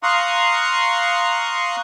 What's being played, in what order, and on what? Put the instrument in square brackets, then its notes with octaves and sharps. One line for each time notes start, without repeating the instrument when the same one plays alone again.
[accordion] F5 A#5 C6 C#6 D#6 F#6